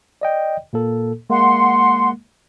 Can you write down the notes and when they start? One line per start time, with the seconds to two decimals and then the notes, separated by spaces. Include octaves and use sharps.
0.21 D5 D#5 G5
0.73 A#2 A#3 A4
1.30 G#3 A#3 F#5 C6